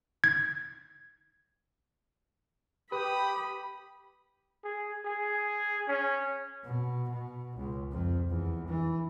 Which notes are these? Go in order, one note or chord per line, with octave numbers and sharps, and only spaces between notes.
G#6
G4 B4 B5 D#6
G#4
G#4
C#4
B2
B2
C#2
F2
E2
E3